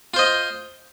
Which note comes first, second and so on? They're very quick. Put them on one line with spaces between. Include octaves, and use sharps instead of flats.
F4 C5 D#5